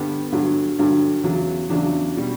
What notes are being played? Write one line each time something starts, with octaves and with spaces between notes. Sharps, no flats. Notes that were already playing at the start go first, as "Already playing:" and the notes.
Already playing: G2 D3 G3 B3
G2 D3 F#3
G2 D3 F#3
E2 C#3 F#3
E2 C#3 F#3 D4
B2 G3